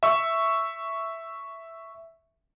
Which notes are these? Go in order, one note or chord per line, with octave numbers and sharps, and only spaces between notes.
E5 C#6 E6